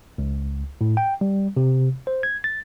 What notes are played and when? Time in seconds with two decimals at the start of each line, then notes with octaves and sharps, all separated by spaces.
0.18 C#2
0.81 A2
0.97 G5
1.21 G3
1.57 C3
2.07 C5
2.23 G#6
2.44 A6